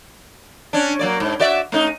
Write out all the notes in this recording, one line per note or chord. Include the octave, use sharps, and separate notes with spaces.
C#4 D4
F#3 A#3 D5
G#2
F#4 D5 E5
A3 C#4 D#4